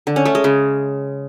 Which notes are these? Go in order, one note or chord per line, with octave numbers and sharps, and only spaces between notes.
D3
C#4
A3
G#3
C#3